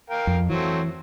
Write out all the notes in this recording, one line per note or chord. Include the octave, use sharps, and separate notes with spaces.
A#4 F5 G5
F2
E3 F#3 A3 C4